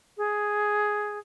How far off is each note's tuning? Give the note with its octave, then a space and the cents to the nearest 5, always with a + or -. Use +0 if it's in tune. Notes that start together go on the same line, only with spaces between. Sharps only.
G#4 +5